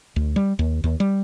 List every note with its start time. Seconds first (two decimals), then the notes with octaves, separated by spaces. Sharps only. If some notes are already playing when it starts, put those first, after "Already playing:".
0.16 D2
0.36 G3
0.59 D#2
0.84 D#2
1.00 G3